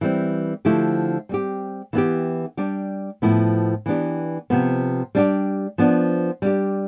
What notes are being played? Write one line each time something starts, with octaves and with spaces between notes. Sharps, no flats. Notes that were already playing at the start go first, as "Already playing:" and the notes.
E3 G3 C4
D3 F3 A3 E4 G4
G3 C4 G4
E3 B3 E4 G4
G3 D4 G4
A2 F3 B3 E4
E3 B3 D4 G4
C3 F3 B3
G3 D4 G4
F3 B3 D4
G3 D4 G4